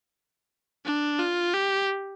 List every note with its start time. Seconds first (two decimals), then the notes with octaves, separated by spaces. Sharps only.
0.85 D4
1.19 F4
1.53 G4